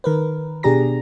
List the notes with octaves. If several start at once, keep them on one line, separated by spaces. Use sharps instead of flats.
D#3 A#4 B4
B2 D4 G4 G#4 A#5 A#6